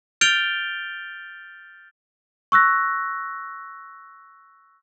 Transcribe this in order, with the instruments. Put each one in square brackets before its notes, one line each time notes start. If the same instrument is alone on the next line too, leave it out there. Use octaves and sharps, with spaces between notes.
[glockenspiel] F6 G6 A6 D7 F7 G7
[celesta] C#6 E6 F#6 A#6